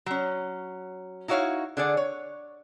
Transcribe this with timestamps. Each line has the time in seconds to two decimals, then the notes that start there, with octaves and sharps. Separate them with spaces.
0.06 F#3 C#4
1.28 D#4 E4 F#4 C#5 F5
1.77 D3 G#4 D5 F#5
1.97 C#5